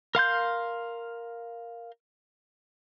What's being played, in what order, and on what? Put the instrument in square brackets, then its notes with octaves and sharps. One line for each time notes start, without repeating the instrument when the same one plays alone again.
[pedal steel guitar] A#4 F5 C6 G6